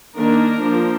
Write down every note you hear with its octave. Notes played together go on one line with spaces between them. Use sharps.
D#3 A#3 D4 A#4
F3 A#3 D4